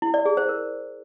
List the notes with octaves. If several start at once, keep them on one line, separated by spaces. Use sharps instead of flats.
E4
D5
G#4
C5
A#4